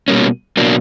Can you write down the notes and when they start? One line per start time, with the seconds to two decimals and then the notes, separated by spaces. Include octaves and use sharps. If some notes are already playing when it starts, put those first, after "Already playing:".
0.08 B2 G3 A#3 C#4
0.57 B2 F#3 A#3 D4